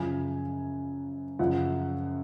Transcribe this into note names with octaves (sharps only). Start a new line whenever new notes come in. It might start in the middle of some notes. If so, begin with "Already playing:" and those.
Already playing: F#2 C#3 F3 G#5
F#2 C#3 F3 F#5